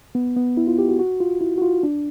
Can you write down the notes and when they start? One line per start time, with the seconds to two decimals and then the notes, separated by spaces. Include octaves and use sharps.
0.15 B3
0.37 B3
0.57 E4
0.67 F4
0.79 G4
0.89 F#4
0.99 F#4
1.20 F4
1.41 E4
1.58 F#4
1.62 F4
1.83 D4